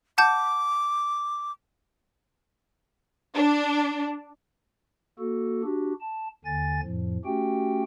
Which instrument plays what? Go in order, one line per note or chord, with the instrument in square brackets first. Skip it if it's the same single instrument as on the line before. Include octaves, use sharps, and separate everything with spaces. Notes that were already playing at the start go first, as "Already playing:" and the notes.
[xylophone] F#5 A5 G6 [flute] D6
[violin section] D4
[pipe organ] A#3 F#4 A4
D4 F#4 G4
A5
D#2 D3 G#5 A6
F2 A2 F3
A3 C#4 F#4 G4 G5